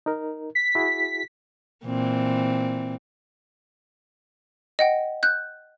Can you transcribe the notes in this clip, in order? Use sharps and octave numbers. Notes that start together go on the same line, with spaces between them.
D#4 A#4
B6
E4 F#4 G#4
A#2 E3 C4
D#5 F#5 G5
F#6 G6